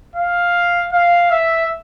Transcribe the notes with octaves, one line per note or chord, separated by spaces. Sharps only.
F5
F5
E5